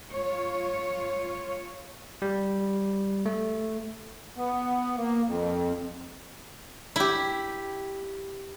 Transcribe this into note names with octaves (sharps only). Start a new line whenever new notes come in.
F4 C#5
G3
A3
B3
A#3
F2
E4 G4